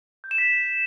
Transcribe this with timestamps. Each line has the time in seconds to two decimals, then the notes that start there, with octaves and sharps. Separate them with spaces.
0.24 G6
0.31 E7
0.38 B6